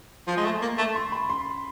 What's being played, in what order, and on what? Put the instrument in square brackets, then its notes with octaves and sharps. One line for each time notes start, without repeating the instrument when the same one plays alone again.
[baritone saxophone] F3
G#3
A3
A#3
A3
[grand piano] C6
B5
C6